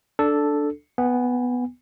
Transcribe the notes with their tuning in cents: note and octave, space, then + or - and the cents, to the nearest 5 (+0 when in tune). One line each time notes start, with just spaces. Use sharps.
D4 +0 A4 +0
B3 +0 G#5 -35